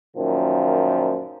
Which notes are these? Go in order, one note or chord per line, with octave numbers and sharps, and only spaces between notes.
F#2 A#2 D#3 F3